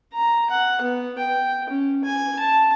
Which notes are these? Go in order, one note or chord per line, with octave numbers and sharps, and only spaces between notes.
A#5
F#5
B3
G5
C#4
G#5
A5